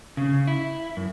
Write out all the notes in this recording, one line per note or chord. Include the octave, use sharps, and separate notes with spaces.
C#3
E4
F#2